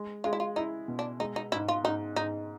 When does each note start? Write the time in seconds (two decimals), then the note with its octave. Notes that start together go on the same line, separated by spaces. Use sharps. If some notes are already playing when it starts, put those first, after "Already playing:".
Already playing: G#3
0.24 G#3 F4
0.33 E4
0.40 F4
0.56 D#4 E4
0.88 B2
0.99 D4
1.20 G#3 D#4
1.36 D#4
1.52 G#2 E4
1.68 F4
1.84 G#2 D#4
2.16 G#2 D#4